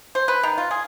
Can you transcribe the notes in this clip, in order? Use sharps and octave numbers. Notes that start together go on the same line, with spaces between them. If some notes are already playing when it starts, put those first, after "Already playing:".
C5
B4
D#3
F4
G#4